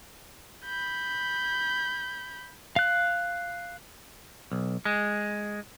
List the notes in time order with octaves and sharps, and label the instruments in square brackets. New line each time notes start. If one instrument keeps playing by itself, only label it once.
[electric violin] B5 G6
[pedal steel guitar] F5 F#6
[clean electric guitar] B1
G#3